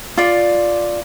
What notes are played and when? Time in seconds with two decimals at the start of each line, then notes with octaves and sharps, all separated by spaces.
0.17 F4 D5